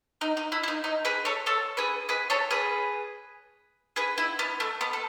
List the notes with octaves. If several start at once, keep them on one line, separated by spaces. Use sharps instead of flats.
D#4
D#4
E4
E4
D#4
D#4
G#4 B4
A4 C#5
A4 C#5
G#4 B4
G#4 B4
A4 C#5
G#4 B4
G#4 B4
E4
B3
A3
B3
A4